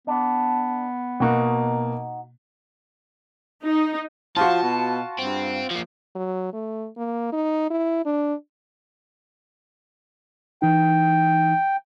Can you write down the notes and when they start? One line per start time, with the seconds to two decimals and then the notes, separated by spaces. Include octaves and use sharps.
0.07 B3 D4
1.20 B2 A#3 D#4 F#4
3.64 D#4
4.37 F3 F4 F#4 A5
4.63 B2
5.19 G2 C4
5.71 F3 A#3
6.16 F#3
6.53 A3
6.97 A#3
7.33 D#4
7.70 E4
8.06 D4
10.62 E3 D#4 G5